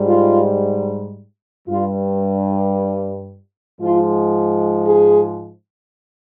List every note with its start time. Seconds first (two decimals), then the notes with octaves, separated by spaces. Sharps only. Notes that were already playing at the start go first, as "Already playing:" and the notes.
Already playing: G#2 G3
0.08 F4
1.68 G2 G3 F4
3.81 G#2 F3 G#3 F4
4.88 G#4